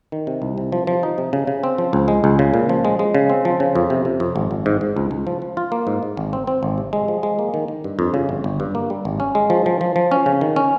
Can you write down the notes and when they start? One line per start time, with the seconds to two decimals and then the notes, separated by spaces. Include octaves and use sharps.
0.12 D#3
0.27 C3
0.42 C2
0.58 C3
0.72 F3
0.87 F3
1.03 D#4
1.18 C3
1.33 C#3
1.47 C#3
1.64 C4
1.78 F3
1.93 C#2
2.08 G#3
2.24 C#2
2.39 C#3
2.54 A#2
2.69 F3
2.85 G#3
2.99 G#3
3.15 C#3
3.30 C4
3.45 F3
3.60 C#3
3.75 F2
3.90 C3
4.05 C3
4.20 F2
4.36 G#1
4.51 G#1
4.66 G#2
4.81 G#2
4.96 C#2
5.11 C#2
5.27 F3
5.42 F3
5.57 F4
5.72 A#3
5.87 G#2
6.03 G#2
6.17 G#1
6.33 C4
6.47 C4
6.63 G#1
6.78 C3
6.93 G#3
7.08 F3
7.23 G#3
7.39 A#3
7.54 D#3
7.68 D#3
7.84 G2
7.99 F2
8.14 C#3
8.29 G1
8.44 G1
8.60 G2
8.75 A#3
8.90 G3
9.05 G#1
9.20 C#4
9.35 G#3
9.50 F3
9.66 F3
9.81 F3
9.96 F3
10.11 C#4
10.26 C#3
10.41 D#3
10.56 C#4